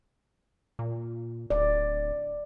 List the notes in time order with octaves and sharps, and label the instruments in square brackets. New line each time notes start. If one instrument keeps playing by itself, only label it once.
[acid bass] A#2
[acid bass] D1 [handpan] D5